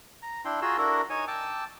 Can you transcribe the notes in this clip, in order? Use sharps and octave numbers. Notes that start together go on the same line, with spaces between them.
A#5
D4 E4 G5 C6
F4 F#4 G#4 A#5 C6 E6
D4 E4 F#4 A4 A#4 A#5
D#4 C#5 G#5
G5 A5 D6 E6